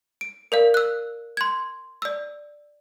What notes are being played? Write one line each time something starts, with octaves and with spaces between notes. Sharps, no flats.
D7
A#4 D5 F5
E6 F#6
C6 G#6
D5 E6